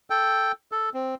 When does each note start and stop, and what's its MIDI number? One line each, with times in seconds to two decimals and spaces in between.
0.10 0.52 69
0.10 0.52 79
0.72 0.90 69
0.94 1.15 60